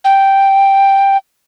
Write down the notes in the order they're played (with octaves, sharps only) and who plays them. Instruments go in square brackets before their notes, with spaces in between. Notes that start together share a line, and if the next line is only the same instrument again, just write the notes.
[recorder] G5